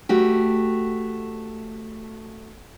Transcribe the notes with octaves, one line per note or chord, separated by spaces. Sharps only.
A3 F#4 G4